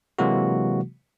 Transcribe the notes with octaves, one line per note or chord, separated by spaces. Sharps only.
C3 E3 F#3 G#3 A#3 F#4